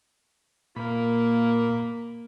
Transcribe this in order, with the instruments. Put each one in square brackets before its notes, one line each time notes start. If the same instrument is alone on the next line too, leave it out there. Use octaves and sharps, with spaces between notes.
[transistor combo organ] A#2 B5 [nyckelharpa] A#3